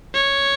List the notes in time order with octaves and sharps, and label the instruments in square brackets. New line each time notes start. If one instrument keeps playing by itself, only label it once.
[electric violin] C#5